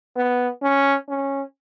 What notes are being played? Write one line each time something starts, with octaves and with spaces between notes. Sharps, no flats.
B3
C#4
C#4